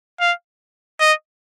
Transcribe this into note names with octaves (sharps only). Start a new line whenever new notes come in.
F5
D#5